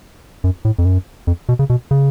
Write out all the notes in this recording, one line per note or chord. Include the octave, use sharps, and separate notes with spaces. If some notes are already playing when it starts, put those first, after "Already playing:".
F#2
A2
F2
F#2
F2
B2
C#3
B2
C#3